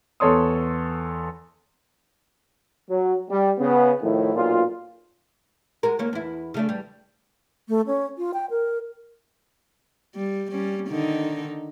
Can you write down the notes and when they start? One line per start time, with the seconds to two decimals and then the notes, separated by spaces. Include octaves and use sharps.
0.20 E2 A4 C#5 C6 D#6
2.88 F#3
3.29 G3
3.59 C#3 B3
4.01 A2 D#3 F3 E4
4.34 B1 A#2 F4
5.83 G#3 F#4 A#4
5.99 D2 A#3 C#4
6.13 E2 E4
6.54 C#3 A3 D4
6.69 E2 G3
7.68 A3
7.87 C#4
8.18 F4
8.34 G5
8.50 A#4
10.15 G3
10.52 G3 C#4
10.88 D3 D#3 D#4